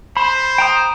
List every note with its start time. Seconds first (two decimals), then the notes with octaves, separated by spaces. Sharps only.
0.17 C5 B5
0.58 G5 A#5 D#6